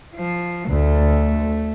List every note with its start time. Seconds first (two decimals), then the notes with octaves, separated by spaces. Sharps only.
0.15 F3
0.69 D2 A3